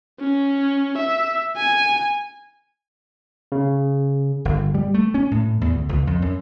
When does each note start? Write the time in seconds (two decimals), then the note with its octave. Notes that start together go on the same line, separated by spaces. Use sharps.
0.20 C#4
0.98 E5
1.57 G#5
3.52 C#3
4.45 G1
4.75 G3
4.94 A3
5.14 C#4
5.31 A2
5.61 E2
5.74 D2
5.89 C#2
6.07 F2
6.22 F#2